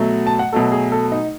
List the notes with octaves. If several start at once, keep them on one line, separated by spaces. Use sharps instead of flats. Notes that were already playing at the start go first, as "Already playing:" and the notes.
Already playing: B2 F#3 A3
A5
F#5
B2 F#3 A3 A4
G#4
A4
D#4